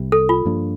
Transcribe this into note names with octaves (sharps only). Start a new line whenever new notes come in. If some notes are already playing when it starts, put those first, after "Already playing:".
Already playing: C2 C3 G3
A4
F4
G2 F3 A#3 D4